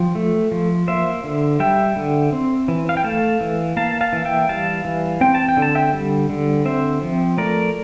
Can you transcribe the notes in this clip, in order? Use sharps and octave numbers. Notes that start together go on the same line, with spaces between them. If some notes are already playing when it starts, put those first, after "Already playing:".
Already playing: F3 G5
A3
F3
A#3 C5 E5
D3
G3 E5 G5
D3
C4
E3
F5
G5
A3 F5 A5
E3
A#3 F5 A5
F5 A5
E3
E5 G5
G3 F5 A5
E3
C4 G5
A5
G5
D3
A5
E5 G5
G3
D3
C4 C5 E5
F3
A3 A#4 D5